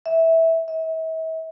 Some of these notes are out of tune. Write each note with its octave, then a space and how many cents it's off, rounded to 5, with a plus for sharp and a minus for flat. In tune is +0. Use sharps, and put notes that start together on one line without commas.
E5 -15
E5 -40